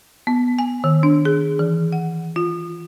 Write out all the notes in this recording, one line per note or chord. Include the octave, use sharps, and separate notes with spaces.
B3
G#5
D#3
D4
G#4
E3
F#5
F4